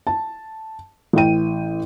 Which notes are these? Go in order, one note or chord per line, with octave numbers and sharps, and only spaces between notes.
A5
A1 E4 G5 D#7